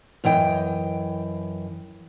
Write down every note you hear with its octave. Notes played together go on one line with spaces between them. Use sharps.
F#2 E3 D#5 G5